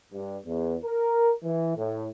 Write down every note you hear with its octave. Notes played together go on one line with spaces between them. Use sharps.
G2
E2
A#4
E3
A2